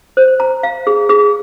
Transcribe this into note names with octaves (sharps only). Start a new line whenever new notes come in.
C5
A#5
F5
G#4
G#4